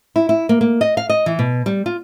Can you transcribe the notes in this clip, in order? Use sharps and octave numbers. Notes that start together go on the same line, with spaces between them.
E4
E4
A#3
A#3
D#5
F5
D#5
E3
B2
G3
F4